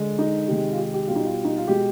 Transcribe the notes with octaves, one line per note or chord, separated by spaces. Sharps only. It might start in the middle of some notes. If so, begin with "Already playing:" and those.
Already playing: D3 G#3
D#4
C3 D#3 G#3
F4
G4
G4
B2 G3 F4
D#4
F4
D#4
F4
B2 G#3 G4